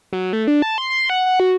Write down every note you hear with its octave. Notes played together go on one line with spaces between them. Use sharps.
F#3
A3
D4
A5
C6
C6
F#5
F#5
F#4